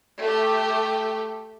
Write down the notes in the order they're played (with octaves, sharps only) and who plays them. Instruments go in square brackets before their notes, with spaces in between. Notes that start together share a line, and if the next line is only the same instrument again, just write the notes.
[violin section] A3 G4